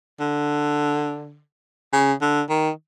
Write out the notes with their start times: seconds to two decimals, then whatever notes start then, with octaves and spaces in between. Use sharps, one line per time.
0.20 D3
1.93 C#3
2.21 D3
2.50 D#3